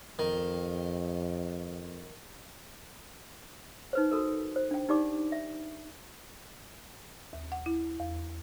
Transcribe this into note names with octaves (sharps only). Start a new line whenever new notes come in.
F2 D#3
D#4 B4 C5
F#4 A4 A#4
C5
D4 G5
D#4 G4 D5 D6
E5
D#2
F#5
E4
E2